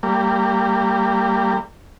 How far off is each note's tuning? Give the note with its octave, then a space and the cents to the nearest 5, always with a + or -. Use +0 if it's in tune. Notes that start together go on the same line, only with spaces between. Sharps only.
G3 +0 A#3 -30